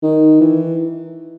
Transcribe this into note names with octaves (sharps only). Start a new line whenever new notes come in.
D#3
E3